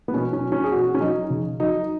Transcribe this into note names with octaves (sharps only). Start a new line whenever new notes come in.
B3
B2 C#4
C#4
F#3
C#4
G#4
B2 F#4
C#4
F#3 D#4
C#3
F#3 D#4